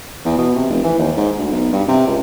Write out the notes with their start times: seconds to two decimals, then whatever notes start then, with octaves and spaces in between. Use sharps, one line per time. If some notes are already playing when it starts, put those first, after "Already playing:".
0.25 E2
0.38 B2
0.56 C3
0.70 F1
0.84 E3
0.99 D#2
1.17 G#2
1.38 D2
1.52 B1
1.72 G2
1.88 C3
2.06 C#2